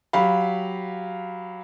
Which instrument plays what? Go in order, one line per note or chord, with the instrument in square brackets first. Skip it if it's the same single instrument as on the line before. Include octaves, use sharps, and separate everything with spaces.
[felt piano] F#3 G4 F5 B5